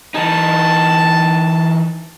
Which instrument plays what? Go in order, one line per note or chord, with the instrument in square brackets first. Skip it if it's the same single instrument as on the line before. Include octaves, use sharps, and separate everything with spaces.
[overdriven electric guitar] E3 D#4 [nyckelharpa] A5